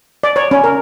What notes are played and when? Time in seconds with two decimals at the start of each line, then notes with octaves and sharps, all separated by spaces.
0.23 D5
0.36 C#5
0.51 C#4
0.64 A#4